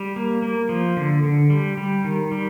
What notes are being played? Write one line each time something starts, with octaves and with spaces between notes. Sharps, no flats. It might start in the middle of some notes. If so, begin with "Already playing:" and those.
Already playing: G3
A#3
A#3
F3
D3
D3
G3
G3
D#3
G3